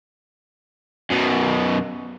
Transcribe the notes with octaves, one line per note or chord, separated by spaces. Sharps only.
F#2 B2